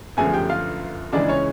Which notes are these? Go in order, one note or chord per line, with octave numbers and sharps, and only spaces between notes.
G1 F#2 D3 F3 A3 G#4 G#5
G4 G5
F4 F5
C#2 C#3 E3 G#3 D4 D5
C#4 C#5